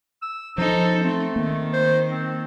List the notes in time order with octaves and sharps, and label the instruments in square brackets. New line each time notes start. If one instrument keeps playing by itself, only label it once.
[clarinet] E6
[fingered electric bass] F3 [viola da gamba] D#4 A4 [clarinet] C5
[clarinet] A3 [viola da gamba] C4
[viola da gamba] D#3 [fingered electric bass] A#3
[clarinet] C5
C4